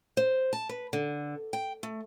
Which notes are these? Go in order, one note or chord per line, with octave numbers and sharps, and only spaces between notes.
C5
A5
B4
D3
G5
A3